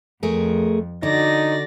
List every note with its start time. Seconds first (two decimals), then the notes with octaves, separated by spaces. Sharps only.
0.23 F2 A3 G#4 A#4
1.03 D3 D#4 F#4 D5 A#6